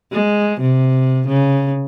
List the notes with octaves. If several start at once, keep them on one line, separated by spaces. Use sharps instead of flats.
G#3
C3
C#3